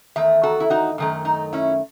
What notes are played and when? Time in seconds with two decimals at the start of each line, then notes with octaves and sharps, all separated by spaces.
0.16 E2 D#3 A3 E5
0.43 F#4 A4
0.60 E4
0.70 D#4 F#4
0.98 F#2 D#3 A3
1.25 D#4
1.53 C#4 E4